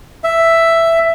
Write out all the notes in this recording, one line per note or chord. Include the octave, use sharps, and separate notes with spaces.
E5